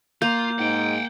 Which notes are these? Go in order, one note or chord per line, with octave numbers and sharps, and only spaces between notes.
A#3 F4 G6
G#2 D#4 F#5 G5